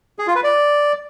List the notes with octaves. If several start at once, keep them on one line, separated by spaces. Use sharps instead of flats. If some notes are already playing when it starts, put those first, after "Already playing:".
G#4
F4
B4
D5